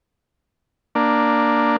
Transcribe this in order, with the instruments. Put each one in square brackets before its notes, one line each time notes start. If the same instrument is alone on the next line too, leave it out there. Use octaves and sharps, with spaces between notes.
[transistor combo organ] A#3 D4